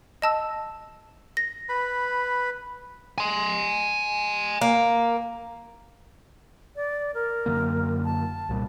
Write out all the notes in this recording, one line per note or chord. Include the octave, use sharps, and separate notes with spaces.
D#5 A5 E6
A#6
B4 B5
G#5 C6
A#3
D5
A#4
F#2 D3 A#3
A5
C2 A#2 G3